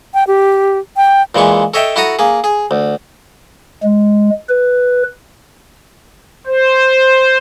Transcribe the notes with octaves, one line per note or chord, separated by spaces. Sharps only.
G5
G4
G5
A#2 E3 G#3 C#6
A4 C#5 D#5 E5 G5
E4 F#4 A4 F#5 A#5 D#6
A#3 G#4
G#4
D2
G#3
B4
C5